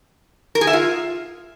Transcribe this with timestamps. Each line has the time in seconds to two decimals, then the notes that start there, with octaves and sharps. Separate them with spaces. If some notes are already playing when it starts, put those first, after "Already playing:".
0.55 A#4
0.61 G#4
0.67 E5
0.73 F4